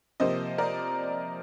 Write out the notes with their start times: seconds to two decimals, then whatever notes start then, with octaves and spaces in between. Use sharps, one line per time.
0.20 C3 F3 A#3 C5 D#5
0.58 A#4 D5